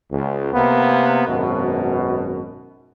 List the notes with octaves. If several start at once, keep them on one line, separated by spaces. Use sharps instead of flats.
C#2
C3 A#3 B3
G#1 F#2 B2